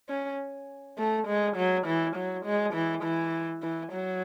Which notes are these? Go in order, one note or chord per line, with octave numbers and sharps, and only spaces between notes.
C#4
A3
G#3
F#3
E3
F#3
G#3
E3
E3
E3
F#3